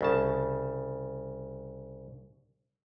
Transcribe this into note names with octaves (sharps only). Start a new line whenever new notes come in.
C2 C#3 A5